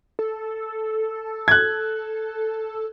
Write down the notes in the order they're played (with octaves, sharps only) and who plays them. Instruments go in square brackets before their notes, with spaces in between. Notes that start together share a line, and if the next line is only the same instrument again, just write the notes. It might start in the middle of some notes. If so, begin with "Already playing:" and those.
[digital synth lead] A4
[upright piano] F#6 G#6